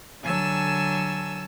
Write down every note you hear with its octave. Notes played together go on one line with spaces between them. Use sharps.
D3 F#3 G#5 A5 E6